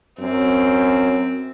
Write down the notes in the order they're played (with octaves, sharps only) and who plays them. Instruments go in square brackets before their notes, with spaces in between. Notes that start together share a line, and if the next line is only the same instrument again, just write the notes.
[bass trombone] F#2 [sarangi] C4